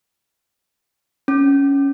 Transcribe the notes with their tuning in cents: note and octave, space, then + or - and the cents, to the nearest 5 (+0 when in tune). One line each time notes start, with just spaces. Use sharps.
C#4 +5